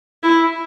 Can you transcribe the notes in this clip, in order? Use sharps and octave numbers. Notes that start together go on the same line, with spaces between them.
E4